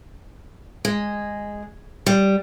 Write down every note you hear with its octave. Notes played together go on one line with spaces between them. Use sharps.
G#3
G3